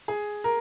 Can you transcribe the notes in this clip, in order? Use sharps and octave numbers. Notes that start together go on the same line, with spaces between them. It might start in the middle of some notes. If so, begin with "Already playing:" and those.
G#4
A#4